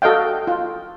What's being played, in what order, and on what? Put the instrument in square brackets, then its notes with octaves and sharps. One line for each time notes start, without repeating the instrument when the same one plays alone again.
[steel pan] F#4 A4 D#5 F5 G5
F4